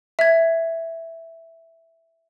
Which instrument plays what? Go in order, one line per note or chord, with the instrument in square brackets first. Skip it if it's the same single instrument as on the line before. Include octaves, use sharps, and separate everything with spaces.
[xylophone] E5 G#6